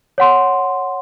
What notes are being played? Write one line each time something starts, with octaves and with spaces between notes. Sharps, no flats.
C#5 F#5 C6